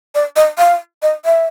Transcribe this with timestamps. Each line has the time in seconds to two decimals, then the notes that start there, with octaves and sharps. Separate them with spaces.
0.15 D5
0.36 D#5
0.58 F5
1.02 D#5
1.25 E5